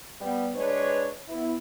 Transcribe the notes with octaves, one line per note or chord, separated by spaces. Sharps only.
G3 B3
G#3 D4 B4 C#5
B3 E4